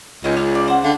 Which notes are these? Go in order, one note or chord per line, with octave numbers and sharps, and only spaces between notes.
C#2 C#4 D#4 G5
D4 F6
D5
C5 F#5
D3 F5 G5